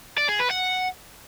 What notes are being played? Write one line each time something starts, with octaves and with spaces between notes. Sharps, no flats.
D5
G#4
B4
F#5